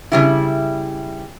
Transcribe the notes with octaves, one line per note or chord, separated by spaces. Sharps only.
C#3 G3 E4